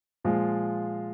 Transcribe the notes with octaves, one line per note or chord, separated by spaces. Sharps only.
A#2 F3 G#3 F4